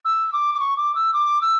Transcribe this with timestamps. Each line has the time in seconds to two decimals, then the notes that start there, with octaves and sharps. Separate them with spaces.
0.05 E6
0.33 D6
0.55 D6
0.60 C#6
0.77 D6
0.95 E6
1.13 D6
1.42 E6